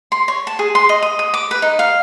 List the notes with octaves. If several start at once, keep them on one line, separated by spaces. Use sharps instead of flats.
C6
C#5
A5
G#4
C6
D#5
D#6
D#6
D6
B4
D#4
F5